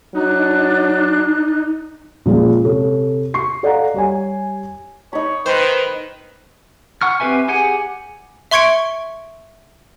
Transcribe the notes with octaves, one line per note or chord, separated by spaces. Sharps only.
F#3 D4 D#4 F#6
A#2 F3 G#3 C#4
C3 A4 C#5
C#6 C7
A4 D5 D#5 F5 F#5 A#5
G3 C#5 G#5
D#4 C#5 B5
D#3 B4 C5
F#5 C#6 F6
C4 G4 B4 E5 G#5
G4 G#4 F#5 G#5
E5 C6 C#6 G#6 C#7 D7